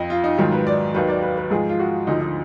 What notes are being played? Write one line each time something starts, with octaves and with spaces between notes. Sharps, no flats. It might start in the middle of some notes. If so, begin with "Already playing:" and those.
Already playing: F2 F3 D#5
F4
D#4
G#2 D#3 F#3 F4
B4
D5
D#2 D#3 F#3 B4
D5
B4
B4
G#2 F3 G#4
F4
F#4
D2 D3 F3 D#4
D#4